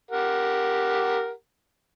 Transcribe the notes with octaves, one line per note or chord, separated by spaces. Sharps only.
G4 A#4 F#5